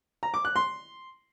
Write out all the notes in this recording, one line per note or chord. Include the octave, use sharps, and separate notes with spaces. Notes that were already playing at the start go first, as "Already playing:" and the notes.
A#5
D6
F#6
C6